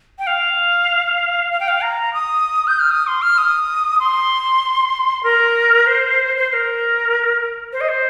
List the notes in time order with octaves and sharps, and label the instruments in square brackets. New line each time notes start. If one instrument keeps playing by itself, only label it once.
[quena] G5
F5
F5
G5
F5
A#5
D#6
G6
F6
D#6
C6
F6
D#6
C6
A#4
C5
C5
C5
A#4
C5
D#5
C5